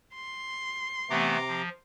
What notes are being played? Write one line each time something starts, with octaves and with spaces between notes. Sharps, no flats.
C6
C3 E3 A3 B3 A#5 D6
F3